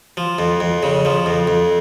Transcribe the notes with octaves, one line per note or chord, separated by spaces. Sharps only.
F3
F2
F2
C#3
F3
F2
F2